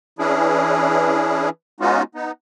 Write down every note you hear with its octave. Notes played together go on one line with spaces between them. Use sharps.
E3 C#4 D4 E4 G#4
G#3 B3 C#4 D#4 F4 F#4
B3 D#4